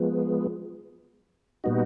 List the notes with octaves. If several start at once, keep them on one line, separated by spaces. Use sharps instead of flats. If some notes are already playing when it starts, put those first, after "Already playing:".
Already playing: F3 G#3 B3
A#2 G3 B3 D#4 F#4